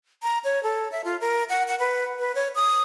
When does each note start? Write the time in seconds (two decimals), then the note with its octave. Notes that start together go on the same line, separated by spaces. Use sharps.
0.23 A#5
0.44 C#5
0.63 A4
0.92 E5
1.04 F4
1.21 A#4
1.49 F#5
1.68 F#5
1.79 B4
2.19 B4
2.35 C#5
2.55 D#6